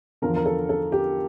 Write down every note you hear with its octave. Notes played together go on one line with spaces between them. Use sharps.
E2 D3 F3 A#4
A#4
A4
A4
G4